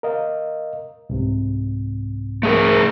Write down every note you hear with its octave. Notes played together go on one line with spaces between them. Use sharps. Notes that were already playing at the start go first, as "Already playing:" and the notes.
A#4 D#5 F5
C2 G#2 C3
A3 G#4 A#4